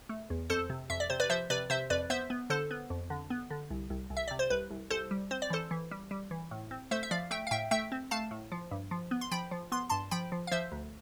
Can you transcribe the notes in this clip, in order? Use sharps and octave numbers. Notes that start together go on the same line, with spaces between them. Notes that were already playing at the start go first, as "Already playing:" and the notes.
A3
E2
F2 A4 C5
C3
F2 E5
D5
C3 C5
B4 D5
F3 C5 E5
C3 B4 D5
C3 C5 E5
F2 B4 D5
B3 C5 E5
B3
D3 A4 C5
B3
F2
D3
B3
D3
C2
C2
C2
E5
C3 D5
C5
C2 B4
C2
C2 A4 C5
G3
C4 C5
D5
E3 A4 C5
E3
G3
G3
E3
A2
C4
A3 C5 E5
E5
F3 D5 F5
A3 E5 G5
F5
A2 E5 G5
A3 E5 G5
C4
A3 F5 A5
A2
F3
G2
F3
B3
C6
F3 G5 B5
F3
B3 C6
G2 A5 C6
F3 G5 B5
F3
F5
F3 C5 E5
D2